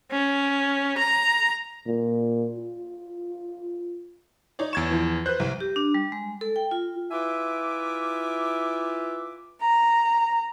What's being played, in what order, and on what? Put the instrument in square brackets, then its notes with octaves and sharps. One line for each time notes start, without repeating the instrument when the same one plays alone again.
[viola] C#4
A#5
[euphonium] A#2
F4
[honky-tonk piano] D#4 C#5 D5
[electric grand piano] E2 G#6 E7 [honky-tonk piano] C#6 A6 D7
[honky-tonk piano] E3 F3
[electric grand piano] B4 C5 [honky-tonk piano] F#6 G6
[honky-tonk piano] C2
[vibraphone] G4
D4
G3
G#3
A4
G5
F4
[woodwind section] E4 F4 B4 E5 G#5 D6
[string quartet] A#5